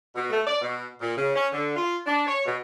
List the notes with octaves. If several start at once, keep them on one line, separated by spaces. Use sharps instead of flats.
B2
A3
D5
B2
A#2
C#3
C#4
D3
F4
D4
C#5
B2